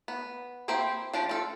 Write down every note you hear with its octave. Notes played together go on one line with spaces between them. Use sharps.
B3
A#3 C4 E4 G4 C5
F3 D4 G4
F4 A4